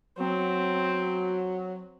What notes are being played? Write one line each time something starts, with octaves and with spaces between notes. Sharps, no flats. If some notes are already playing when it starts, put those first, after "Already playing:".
F#3 C4